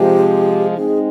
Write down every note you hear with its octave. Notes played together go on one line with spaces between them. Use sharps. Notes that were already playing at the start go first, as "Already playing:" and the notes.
Already playing: C3 F3 G#3 G4
G#3 C4 D#4 G#4